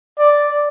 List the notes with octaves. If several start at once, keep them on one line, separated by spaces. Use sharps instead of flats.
D5